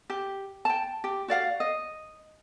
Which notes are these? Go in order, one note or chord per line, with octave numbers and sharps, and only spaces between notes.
G4
G5 A5
G4
F#4 D5 F5 F#5
D#5